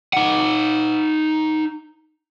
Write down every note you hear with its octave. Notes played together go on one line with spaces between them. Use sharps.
D#4 F#5